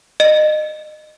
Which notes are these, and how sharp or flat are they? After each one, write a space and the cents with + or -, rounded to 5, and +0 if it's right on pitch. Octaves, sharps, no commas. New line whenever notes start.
D#5 -25